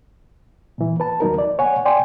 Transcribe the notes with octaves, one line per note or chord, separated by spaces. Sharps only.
A#2 E3
B4 A5
D#2 F#3 D#4 A#4
D5
C#5 F#5 G#5
D5 G5 G#5 C6